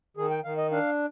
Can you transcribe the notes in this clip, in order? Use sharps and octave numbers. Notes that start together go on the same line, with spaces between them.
D#3 G#4
G5
D#3 F5
D#5
D4 F5